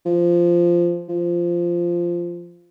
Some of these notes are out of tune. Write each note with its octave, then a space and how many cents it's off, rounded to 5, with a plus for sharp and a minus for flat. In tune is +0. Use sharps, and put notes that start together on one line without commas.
F3 -10
F3 -10